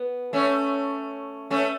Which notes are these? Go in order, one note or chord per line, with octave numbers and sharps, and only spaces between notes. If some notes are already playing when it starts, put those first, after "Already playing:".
Already playing: B3
A3 C#4
A3 C#4